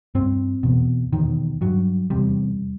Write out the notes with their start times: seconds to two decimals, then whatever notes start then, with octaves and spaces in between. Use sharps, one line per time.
0.15 G2 C4
0.63 E2 B2
1.13 E2 B2 D#3
1.61 G2 F#3
2.10 E2 C3 G3